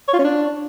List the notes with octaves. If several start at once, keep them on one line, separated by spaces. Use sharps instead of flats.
C#5
F4
C#4
D4